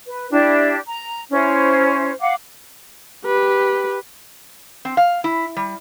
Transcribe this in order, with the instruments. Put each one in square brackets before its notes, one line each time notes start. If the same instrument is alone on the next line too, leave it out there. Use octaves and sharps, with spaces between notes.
[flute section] B4
D4 E4 G4
A#5
C#4 E4 C5
F5 F#5 D6
[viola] G4 B4
[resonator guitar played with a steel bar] C4
F5
E4
G3